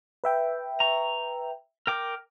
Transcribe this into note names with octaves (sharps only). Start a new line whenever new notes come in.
B4 E5 G5
A#5 C#6
A#4 G5 D6